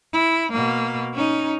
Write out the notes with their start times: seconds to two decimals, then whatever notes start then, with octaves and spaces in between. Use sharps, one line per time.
0.13 E4
0.52 B2 A#3
1.14 C#4 D#4